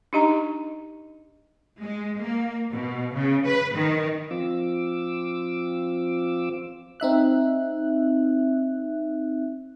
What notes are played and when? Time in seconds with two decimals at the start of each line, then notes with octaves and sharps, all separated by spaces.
0.13 D4 D#4 G4 D#5 A#5
1.80 G#3
2.21 A#3
2.72 B2
3.15 C#3
3.46 B4
3.75 D#3
4.31 F3 C4 F4 D6 E6
7.00 C4 D#4 E5 F#6